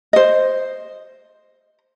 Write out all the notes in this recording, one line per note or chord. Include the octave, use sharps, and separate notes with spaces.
C5 D#5